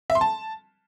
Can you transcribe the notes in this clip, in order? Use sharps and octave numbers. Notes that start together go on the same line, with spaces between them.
E5
C6
A5